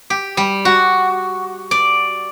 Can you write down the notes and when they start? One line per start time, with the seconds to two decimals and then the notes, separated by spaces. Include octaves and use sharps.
0.10 G4
0.37 G3
0.65 F#4
1.71 D5